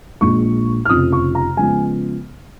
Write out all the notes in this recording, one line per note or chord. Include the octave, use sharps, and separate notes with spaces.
A#1 A#2 G#3 C#6
F6
F1 F2 C#3 F3 D#6
C#6
A#5
C#3 F3 G#3 B3 G#5